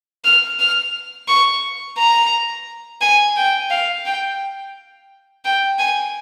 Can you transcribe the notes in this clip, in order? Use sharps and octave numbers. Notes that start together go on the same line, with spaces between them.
F6
F6
C#6
A#5
G#5
G5
F5
G5
G5
G#5